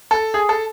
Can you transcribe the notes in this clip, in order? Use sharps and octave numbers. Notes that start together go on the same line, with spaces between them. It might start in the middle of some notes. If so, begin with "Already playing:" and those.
A4
G#4
A4